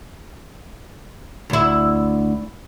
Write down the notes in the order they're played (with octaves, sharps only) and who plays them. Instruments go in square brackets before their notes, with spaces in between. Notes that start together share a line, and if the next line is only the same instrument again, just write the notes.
[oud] D2 E4